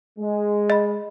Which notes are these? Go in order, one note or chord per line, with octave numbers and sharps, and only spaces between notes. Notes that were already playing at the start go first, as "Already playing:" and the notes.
G#3
D#5 B5